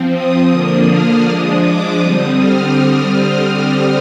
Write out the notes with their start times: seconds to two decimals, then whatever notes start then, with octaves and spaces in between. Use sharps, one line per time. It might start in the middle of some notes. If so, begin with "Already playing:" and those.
Already playing: F3 C4
0.13 D#6
0.50 D3 F3 A#3 D4 D#6
0.89 F6
1.25 F3 G#3 D4 D#6
1.64 D6
2.00 D3 G3 C4 D#6
2.38 F6